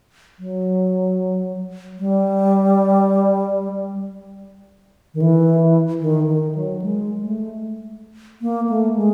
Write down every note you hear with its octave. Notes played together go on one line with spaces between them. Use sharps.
F#3
G3
D#3
E3
D#3
D#3
F#3
G#3
A3
A#3
A3
G#3